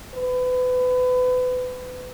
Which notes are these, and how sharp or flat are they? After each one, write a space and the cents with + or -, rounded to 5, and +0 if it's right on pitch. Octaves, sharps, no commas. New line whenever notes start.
B4 +30